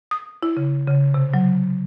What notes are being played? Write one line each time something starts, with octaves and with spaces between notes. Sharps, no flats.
D#6
E4
C#3
C#3
C3
F#3